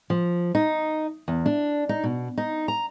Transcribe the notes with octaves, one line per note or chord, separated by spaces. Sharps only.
F3
D#4
E2
D4
D#4
B2
D#4
A#5